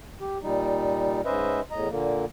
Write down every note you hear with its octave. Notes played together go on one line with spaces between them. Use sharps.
G4
A#2 G3 D#4
G#2 C#4 B4 C5 D#5 E5
E2 A2 D#5 A#5
A#2 D3 A#3